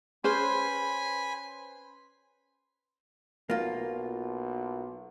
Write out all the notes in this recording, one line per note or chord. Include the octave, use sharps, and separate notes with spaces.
C#4 G#4 B4 C5 G#5 B5 C6
B1 A#3 F4